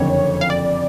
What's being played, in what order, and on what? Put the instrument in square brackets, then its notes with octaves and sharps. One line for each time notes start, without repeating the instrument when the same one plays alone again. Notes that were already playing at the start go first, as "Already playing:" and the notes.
Already playing: [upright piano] F#1 F2 D3 [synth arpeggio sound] C#5
[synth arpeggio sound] F5
D5